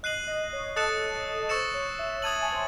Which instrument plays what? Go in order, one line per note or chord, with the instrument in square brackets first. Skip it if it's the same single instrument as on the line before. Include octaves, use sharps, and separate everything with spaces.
[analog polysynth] D#5 [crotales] F#6 C7 D#7 F#7
[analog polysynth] D#5
D#5
C#5
[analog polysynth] A4 [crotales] D#6 F#6 A6 C#7 E7
[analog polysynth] C5 [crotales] C#6 E6 A6 C#7 E7
[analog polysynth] C#5
E5
[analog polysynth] A5 [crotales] D#6 G#6 D#7 F#7
[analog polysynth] A5
G#5
C5